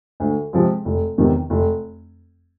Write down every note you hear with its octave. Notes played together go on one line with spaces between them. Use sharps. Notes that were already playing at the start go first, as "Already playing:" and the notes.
D2
C3 F3 G#3
F1
E2 C3 D#3
F1